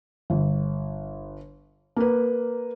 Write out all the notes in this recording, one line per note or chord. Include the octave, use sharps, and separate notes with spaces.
G1
A#3 B4